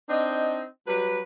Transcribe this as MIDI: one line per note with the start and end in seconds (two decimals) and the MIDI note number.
0.09 0.63 60
0.09 0.63 62
0.09 0.63 63
0.09 0.63 75
0.87 1.21 54
0.87 1.21 55
0.87 1.21 71